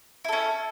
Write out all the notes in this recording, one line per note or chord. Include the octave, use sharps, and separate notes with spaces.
C#4 E4 A4